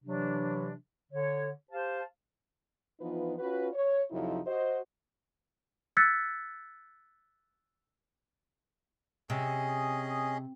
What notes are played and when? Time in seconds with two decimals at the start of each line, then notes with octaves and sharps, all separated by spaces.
0.05 C3 E3 F#3 D4
1.12 D3 C#5
1.71 G4 C5 F5 A5
3.00 E3 F3 B3 D#4 F4 B4
3.39 C#4 F4 F#4 B4
3.73 C#5
4.11 F2 C3 F3 F#3 D#4 E4
4.47 F#4 C5 D#5
5.97 E6 F#6 G#6 A6 B6 C#7
9.30 C3 C#4 G#4 D#5